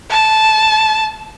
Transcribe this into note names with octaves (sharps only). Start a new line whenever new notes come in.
A5